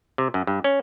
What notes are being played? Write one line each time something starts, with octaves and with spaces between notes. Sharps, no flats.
C3
F#2
G2
C#4